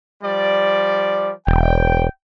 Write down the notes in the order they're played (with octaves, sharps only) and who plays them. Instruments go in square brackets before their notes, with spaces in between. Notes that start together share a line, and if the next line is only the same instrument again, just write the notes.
[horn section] F3 G3 D5
[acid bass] E1 [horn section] G5